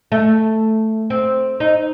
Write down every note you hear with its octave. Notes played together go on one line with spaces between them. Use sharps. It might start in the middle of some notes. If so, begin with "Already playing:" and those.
A3
C4
D#4